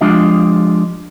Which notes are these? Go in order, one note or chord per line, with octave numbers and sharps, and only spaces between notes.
F3 G#3 D4 F4 G4 D#5